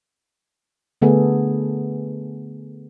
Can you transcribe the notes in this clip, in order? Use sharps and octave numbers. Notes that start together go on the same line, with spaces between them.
D3 A3 B3 G#4 A4